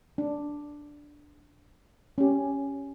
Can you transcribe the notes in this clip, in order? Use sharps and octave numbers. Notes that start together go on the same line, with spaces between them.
D4
C#4 G4